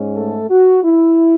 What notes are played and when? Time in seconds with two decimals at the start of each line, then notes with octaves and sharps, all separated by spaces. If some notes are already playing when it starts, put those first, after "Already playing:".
Already playing: G#2 G#3 C#4
0.16 A3 A4
0.50 F#4
0.84 E4